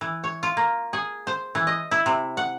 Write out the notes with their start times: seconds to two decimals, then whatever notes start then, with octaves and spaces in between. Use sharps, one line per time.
0.01 E3
0.24 C#5
0.43 F4
0.57 A#3
0.93 G#4
1.27 C5
1.55 E3
1.67 D#5
1.91 E4
2.06 C3
2.37 F#5